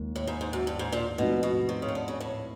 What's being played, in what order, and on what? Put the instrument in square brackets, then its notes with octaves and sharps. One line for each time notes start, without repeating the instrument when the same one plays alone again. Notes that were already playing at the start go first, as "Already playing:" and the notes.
Already playing: [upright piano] D#2 G#3
[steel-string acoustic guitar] A2
G#2
G#2
F#2
G2
G#2
A#2
[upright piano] G#2 F3 A3 C4 [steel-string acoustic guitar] B2
[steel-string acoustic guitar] B2
C3
C#3
D#3
D3
C#3
A2